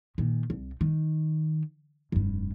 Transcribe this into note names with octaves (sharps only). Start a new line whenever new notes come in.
A#2 D#3
C2
D#3
F1 G2